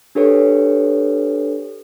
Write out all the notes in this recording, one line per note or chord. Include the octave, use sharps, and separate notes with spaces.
D4 G4 A4 B4 C#5